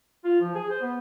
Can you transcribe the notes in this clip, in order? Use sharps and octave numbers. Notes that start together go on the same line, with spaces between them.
F4
F3
G#4
C5
B3